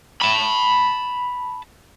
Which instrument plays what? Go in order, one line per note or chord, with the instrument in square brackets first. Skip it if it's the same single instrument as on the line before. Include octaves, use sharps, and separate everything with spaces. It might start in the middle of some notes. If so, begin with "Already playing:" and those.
[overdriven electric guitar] A5 B5